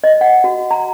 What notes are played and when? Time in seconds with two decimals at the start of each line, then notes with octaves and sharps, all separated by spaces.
0.04 D#5
0.21 F#5
0.44 F#4
0.71 A#5